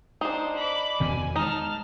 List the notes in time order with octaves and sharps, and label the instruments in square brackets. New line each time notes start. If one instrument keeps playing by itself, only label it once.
[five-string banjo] D4 D#4 [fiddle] C5
[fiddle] B5 D6
[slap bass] E2 B2 D#3 [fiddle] G#5
[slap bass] G#3 [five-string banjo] D#4 [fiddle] A5 F6